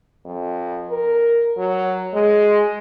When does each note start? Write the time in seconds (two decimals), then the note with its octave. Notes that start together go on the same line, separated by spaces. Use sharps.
0.25 F2
0.90 A#4
1.57 F#3
2.14 G#3